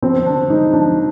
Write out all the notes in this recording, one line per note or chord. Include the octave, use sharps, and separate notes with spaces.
F3 C4
D3 D4
G#3 D#4
F3 D4